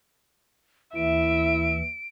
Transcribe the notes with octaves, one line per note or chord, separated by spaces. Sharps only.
D#2 E3 E4 E5 D7